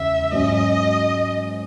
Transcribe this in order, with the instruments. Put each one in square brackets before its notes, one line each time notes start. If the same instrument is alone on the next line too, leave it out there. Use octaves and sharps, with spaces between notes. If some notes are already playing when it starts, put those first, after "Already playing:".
Already playing: [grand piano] E2 C#3 G#3 C#4 [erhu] E5
[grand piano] G#2 F#3 C#4 F#4 [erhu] D#5